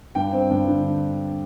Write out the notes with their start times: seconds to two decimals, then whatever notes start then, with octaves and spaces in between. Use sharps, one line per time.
0.15 G2 G5
0.33 C4
0.51 G2
0.68 D3